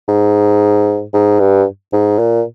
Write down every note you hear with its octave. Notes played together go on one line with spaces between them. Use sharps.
G#2
G#2
G2
G#2
A#2